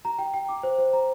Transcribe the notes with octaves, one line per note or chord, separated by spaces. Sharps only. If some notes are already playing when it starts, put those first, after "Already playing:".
A#5
G5
G5
D6
C5
C5
A#5